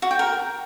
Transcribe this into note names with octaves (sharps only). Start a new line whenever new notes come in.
F#4
G5
A#4